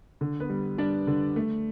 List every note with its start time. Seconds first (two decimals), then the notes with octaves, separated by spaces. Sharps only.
0.21 D3
0.40 B3 B4
0.49 G3
0.78 G3 D4 D5
1.07 D3
1.36 A3